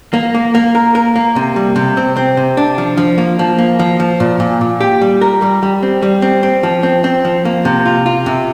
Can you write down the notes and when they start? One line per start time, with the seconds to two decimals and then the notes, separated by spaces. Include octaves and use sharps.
0.14 A#3
0.35 A#3
0.55 A#3
0.75 A#4
0.95 A#4
1.16 A#3
1.36 C3
1.56 G3
1.76 C3
1.97 C4
2.17 C4
2.37 C3
2.57 D4
2.78 F3
2.97 F3
3.18 A#3
3.39 F3
3.58 A#3
3.79 F3
4.00 F3
4.20 A#2
4.40 A#2
4.61 A#2
4.81 G4
5.02 G3
5.21 A#4
5.42 G3
5.63 G3
5.83 C4
6.02 G3
6.22 C4
6.43 C4
6.63 F3
6.83 C4
7.04 C4
7.25 F3
7.45 A#3
7.65 C3
7.86 F4
8.06 F4
8.26 C3